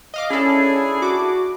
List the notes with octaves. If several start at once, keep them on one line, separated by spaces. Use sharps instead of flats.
D#5 F5 D6
C#4 D4 E4 G#4 A4
F#4 D6